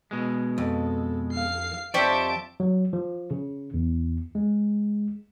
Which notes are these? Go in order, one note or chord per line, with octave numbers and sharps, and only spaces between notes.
B2 G#3
F2 A4
F5 C7
F2 G4 C5 D5 E5 A5 C#6 D7
F#3
F3
C#3
E2
G#3